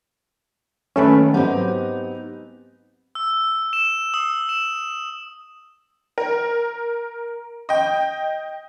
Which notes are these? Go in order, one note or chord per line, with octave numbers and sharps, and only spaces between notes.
D#3 A3 A#3 C#4 A4 B4 E5 B5
G#2 F#3 B3 C4 D#4 G4
E6
E7
D#6
E7
A#4
D#5 G5